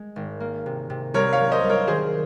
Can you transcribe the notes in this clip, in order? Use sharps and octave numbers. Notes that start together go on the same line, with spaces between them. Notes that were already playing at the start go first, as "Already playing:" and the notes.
Already playing: G#3
G#1
A#3
C3
C3
C2 A#4 C#5
C#5 F5
F#3
C5 D#5
C2
A#4 C#5
D#3 G#4 C5